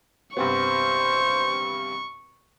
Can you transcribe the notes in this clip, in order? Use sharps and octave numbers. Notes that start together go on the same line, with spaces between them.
G2 C3 B3 C5 C#6